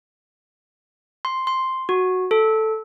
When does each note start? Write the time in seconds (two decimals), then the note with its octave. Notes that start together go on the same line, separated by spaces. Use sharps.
1.25 C6
1.47 C6
1.89 F#4
2.31 A4